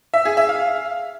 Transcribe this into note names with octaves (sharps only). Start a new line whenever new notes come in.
E5
G#4
E5
F5